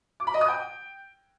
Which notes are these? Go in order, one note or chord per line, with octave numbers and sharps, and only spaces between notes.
D6
B5
D#5
D#6
G5